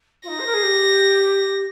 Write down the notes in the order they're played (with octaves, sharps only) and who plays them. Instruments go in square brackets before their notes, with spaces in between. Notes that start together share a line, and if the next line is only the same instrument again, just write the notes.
[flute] F4
[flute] D#4 [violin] A#6
[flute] C5
A#4
G#4
G4